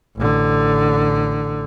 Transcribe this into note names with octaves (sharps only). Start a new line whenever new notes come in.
A1 D3